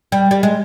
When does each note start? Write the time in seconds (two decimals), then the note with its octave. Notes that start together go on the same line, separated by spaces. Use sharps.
0.12 G3
0.31 G3
0.43 G#3